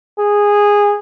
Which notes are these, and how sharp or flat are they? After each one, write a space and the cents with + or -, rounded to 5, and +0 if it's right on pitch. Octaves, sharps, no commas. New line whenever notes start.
G#4 -15